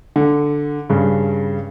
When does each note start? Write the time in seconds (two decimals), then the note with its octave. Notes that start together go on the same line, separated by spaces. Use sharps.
0.16 D3
0.90 G2 C#3